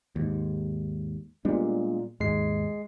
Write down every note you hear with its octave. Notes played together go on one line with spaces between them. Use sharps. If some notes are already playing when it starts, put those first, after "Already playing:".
D#2 G#2
A#2 G3 G#3 B3 D4
D#2 G#2 G#3 C7